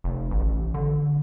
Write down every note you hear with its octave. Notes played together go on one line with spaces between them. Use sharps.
F1
A1
D3